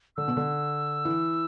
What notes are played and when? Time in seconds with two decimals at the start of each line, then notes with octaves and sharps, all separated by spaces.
0.17 D3 E6
0.28 B2
0.37 D3
1.05 E3